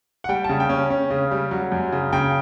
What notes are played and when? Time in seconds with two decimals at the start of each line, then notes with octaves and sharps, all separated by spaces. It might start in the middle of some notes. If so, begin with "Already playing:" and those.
0.24 F#5
0.29 G3 G5
0.44 C#3 A5
0.60 G5
0.69 C#4
0.90 C#4
1.10 C#3
1.31 G3
1.51 F#3
1.72 F#2
1.92 C#3
2.13 C#3 G5